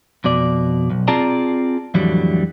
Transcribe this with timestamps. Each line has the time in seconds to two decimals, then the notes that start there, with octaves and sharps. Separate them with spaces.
0.24 F2 B2 D5
0.90 B1
1.08 C4 F4 G#4 D5 A5 A#5
1.94 F2 A2 D3 E3 F#3 G3